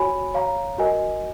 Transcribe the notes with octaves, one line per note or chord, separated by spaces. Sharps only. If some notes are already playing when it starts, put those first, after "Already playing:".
Already playing: F#4 C#5 G#5 B5
C#5 F5 A#5
F#4 A#4 D#5 G#5